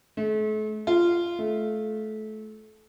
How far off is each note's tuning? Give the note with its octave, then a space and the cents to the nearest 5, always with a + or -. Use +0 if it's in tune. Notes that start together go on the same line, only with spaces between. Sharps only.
A3 -40
F4 -15
A3 -25